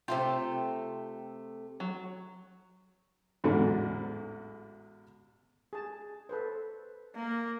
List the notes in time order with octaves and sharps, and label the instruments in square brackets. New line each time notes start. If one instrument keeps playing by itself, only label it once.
[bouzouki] C3 A3 G5 [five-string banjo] F4 C5
[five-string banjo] F#3
[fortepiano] A1 E2 G#2 D3 F#3
[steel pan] G#4 A5
A4 B4 C5
[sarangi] A#3